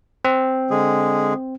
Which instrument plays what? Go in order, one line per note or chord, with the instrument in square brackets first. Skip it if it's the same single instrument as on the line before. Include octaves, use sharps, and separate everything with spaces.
[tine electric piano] C4
[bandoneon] D3 G#3 G#4